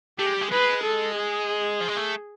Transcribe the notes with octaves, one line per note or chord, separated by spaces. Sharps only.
A3 G4
G#3
G3
G#3
G#3 B4
A4
G#4
F3
G#3
A3